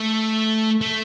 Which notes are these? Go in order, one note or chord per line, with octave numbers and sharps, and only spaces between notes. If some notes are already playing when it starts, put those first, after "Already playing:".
Already playing: A3
A3